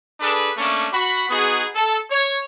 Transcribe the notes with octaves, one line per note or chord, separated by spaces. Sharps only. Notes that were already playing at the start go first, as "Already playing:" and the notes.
D4 G#4 A4 B4
A3 A#3 C#4 D4 C#6
F#4 B5
B3 D#4 F#4 G#4
A4
C#5